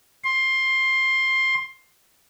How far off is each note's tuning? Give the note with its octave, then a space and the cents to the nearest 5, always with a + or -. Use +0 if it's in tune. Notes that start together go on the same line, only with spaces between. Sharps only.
C6 +15